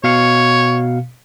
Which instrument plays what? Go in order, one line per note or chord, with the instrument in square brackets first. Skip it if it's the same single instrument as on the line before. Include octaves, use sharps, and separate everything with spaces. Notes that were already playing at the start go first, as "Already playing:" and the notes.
[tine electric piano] B2 F5 C#7 [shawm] C#5